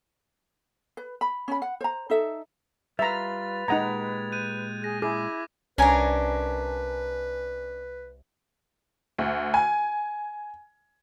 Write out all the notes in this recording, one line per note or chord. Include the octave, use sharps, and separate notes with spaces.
B4
B5
C#4 B5
F#5
C5 A#5
D#4 A4 E5
G3 F4 B4 E5 A#5 A6 F7
A#2 G#3 D#4 G4 F#5 A#5 G#6 F7
F#6 G6 D#7
G#4 F#6 A#6
E4 G#4 D6
C2 C#4 D4 A#4 B4 G#5 A#5
D2
G#5